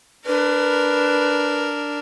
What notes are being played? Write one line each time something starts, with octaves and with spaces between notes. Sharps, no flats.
D4 A#4 B4